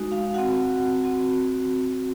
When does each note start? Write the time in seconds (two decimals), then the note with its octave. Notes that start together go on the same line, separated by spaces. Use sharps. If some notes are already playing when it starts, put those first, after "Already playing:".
Already playing: G#3 D#4 F#4
0.12 F5
0.34 C4 F#4 F#5
1.04 C4 F#4